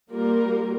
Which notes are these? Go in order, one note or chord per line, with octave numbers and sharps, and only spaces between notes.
G3 A#3 F4 A#4